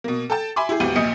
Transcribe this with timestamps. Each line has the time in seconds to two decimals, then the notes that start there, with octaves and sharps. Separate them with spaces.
0.04 B2 A#3
0.30 A4 G5 A5
0.56 E5 G#5 B5 C6 D6
0.69 E4 G4 G#4
0.80 G#1 D2 B3 G4 G6 D#7
0.96 A#1 A#2 D#5 D#6 C#7